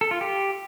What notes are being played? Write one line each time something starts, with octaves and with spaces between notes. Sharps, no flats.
A4
F4
G4